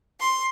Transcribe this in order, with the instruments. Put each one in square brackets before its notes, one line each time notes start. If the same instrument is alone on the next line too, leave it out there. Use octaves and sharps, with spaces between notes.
[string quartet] C6